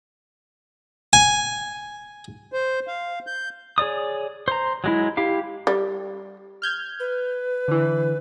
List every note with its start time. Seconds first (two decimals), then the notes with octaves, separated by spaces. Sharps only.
1.13 G#5
2.52 C5
2.88 F5
3.27 G6
3.78 G#4 C#5 D5 D#6
4.48 C5 A#5
4.84 F#3 G#3 E4
5.17 E4 G4 F5
5.67 G3
6.62 F6 G6 G#6
7.00 B4
7.68 D3 E3